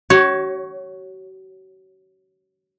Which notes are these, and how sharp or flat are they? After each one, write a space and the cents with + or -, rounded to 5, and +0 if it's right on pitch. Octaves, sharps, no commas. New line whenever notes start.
F#4 +40 C#5 +0